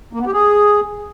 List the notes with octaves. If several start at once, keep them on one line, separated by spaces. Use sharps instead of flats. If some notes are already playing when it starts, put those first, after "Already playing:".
A#3
B3
G4
G#4